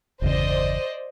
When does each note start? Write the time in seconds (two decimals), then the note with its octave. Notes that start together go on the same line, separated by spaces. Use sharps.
0.22 G1 E2 C#3 C5 D5 D#5